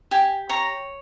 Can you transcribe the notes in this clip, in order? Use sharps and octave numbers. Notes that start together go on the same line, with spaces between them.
G4 G#5
C#5 A#5